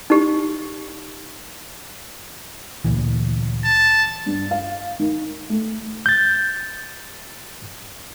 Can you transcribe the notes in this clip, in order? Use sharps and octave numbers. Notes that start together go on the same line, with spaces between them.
D#4 G4
D2 A#2 E3
A5
G2
F5
D#3
A3
G6 A6